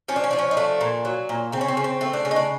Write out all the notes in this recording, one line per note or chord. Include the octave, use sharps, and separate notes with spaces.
F3 C#4
D4
C#4
F3 D4
C#4
D#4
A3 D4
A#2
F#3
A#2
C#3 C4
C#4
C4
C#3 C#4
C4
A3 C4
D4
C#3 C#4
D#4
D4